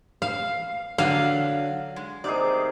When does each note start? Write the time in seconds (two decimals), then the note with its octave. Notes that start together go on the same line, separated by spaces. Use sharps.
0.22 F5
0.98 D3 F#3 F5
1.96 G#3
2.24 C3 D#3 G#4 D5